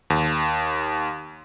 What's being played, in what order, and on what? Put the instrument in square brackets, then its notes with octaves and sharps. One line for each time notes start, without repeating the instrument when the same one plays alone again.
[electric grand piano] D#2